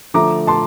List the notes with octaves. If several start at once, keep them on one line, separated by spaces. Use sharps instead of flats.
D3 F3 A3 A#5 D6
A5 C6